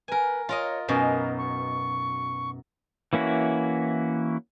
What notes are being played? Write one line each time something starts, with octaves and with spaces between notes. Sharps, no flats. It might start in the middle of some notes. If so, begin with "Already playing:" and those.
A#4 B4 G#5
F4 A#4 C#5 D#5
F#2 B2 D#4 A#4
C#6
E3 A#3 C#4 E4 F#4